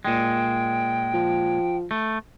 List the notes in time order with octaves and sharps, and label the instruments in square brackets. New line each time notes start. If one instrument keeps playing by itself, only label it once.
[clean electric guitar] A#2 G#3 [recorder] G5
[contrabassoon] F3
[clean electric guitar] A3